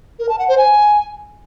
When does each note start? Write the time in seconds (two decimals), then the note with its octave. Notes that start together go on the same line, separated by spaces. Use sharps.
0.19 A#4
0.29 A5
0.39 F#5
0.48 C5
0.58 G#5